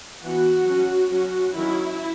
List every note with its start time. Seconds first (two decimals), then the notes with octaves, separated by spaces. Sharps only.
0.22 E3 B3 F#4
0.65 F#3 C#4
1.10 F#3 C#4 F#4
1.54 D#3 F#3 C#4 E4